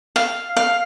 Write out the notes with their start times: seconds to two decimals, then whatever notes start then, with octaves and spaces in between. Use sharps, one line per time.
0.16 F5
0.57 F5